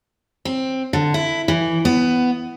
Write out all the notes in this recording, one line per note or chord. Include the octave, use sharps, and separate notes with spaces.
C4
D3
E4
E3
B3